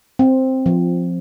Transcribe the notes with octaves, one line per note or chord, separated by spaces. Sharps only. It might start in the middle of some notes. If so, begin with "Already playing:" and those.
C4
F3